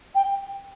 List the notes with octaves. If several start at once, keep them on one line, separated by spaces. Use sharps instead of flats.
G5